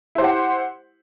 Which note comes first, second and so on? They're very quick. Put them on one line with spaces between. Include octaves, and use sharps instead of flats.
E4 C5 G4 F#5